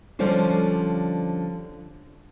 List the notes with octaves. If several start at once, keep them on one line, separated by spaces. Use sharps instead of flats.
D3 F3 G3 C#4 F4 C5